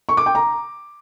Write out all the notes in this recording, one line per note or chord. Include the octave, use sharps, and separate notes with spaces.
C#6
D6
G5
A#5